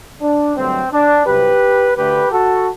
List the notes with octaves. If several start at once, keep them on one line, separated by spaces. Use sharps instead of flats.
D4
G2 D3 F#3 A3 C4
D4
C2 C3 F#3 G4 B4
D2 D3 A3 G4 B4
F#4 A4